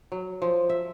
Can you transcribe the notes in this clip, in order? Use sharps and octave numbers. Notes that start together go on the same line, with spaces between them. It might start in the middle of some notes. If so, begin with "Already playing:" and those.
F#3
F3
E5